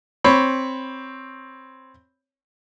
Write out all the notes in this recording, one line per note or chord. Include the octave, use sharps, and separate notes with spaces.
C4 C#5 B5